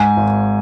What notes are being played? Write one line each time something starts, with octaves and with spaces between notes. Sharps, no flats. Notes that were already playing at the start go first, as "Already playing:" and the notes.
Already playing: G#2 G#5
G#1